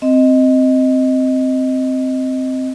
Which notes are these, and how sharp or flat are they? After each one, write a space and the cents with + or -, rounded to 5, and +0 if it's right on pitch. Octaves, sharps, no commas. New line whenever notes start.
C4 -5 D#5 +5